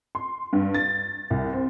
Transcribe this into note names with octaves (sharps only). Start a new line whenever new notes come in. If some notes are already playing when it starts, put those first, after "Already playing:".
C6
G2
A6
C2
C4